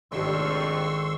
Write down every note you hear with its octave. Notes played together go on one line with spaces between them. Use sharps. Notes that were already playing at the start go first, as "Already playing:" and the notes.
G#1 F2 A3 D4 G4 C6 C#6 E6